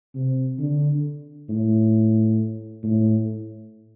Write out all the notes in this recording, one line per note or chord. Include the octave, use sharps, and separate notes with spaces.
C3
D3
A2
A2